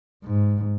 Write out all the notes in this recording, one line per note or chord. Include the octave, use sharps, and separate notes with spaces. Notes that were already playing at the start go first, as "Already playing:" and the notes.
G#2